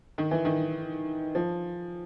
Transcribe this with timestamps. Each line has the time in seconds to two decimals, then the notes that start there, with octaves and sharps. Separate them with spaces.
0.18 D#3
0.31 E3
0.45 D#3
1.35 F3